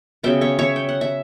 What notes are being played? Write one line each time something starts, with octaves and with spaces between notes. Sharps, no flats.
C#3 F#3 B3 E5 G5
C#5 E5
C#5 E5
G5
F#5
E5